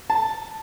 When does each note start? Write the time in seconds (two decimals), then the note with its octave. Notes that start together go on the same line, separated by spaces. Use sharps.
0.10 A5